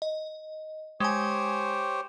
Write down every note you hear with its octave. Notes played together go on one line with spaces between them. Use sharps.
D#5
G#3 G4 C5 C#5 G#5